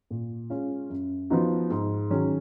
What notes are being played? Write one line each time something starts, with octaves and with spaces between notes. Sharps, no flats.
A#2
G#3 C#4 F4
F#2
F3 B3 D#4 F#4
G#2
D#3 F#3 C#4 G#4